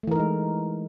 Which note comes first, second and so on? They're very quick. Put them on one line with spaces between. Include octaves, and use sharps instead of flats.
A3 E3 A#4 D#4 G#3